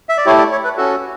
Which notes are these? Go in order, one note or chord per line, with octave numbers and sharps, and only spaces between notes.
E5
D5
A3 E4 G4 C#5
D5
C#5
B4
C#4 F#4 A4